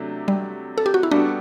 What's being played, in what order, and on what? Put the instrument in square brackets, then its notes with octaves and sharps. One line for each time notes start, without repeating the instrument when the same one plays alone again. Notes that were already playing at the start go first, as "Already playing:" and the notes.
Already playing: [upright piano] C3 F#3 A3 D4
[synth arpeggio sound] G3
A4
G4
F#4
E4
[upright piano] G3 B3 F#4 A4 [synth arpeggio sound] D4